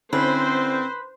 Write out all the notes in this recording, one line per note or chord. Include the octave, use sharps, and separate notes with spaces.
D3 C4 C#4 E4 B4 C5